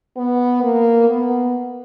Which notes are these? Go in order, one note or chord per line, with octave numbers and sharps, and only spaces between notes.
B3
A#3
B3